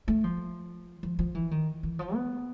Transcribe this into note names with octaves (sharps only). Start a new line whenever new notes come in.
A3
F3
F3
F3
E3
D#3
E3
F3
B3